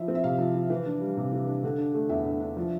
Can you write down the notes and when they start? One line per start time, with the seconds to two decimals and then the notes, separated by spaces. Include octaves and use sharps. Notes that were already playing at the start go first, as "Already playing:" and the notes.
Already playing: F3 E4 E5
0.08 C4
0.15 E5
0.24 C3 F5
0.38 F3
0.54 E4
0.70 E3
0.86 D4
1.01 G3
1.17 C3
1.32 E3
1.47 D4
1.63 D3
1.78 D4
1.94 A3
2.09 E2 E5
2.25 D3
2.40 D4
2.57 F3